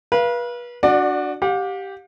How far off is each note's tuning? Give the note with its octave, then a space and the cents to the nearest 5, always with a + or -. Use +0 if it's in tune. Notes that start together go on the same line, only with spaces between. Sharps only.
B4 -35 F5 -25
D4 +0 F#4 -10 D5 +25
G4 -5 F5 +45